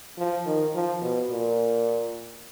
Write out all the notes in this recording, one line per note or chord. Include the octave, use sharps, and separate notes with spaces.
F3
D#3
F3
B2
A#2